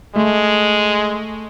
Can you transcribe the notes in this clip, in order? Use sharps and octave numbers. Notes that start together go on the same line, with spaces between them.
G#3 A3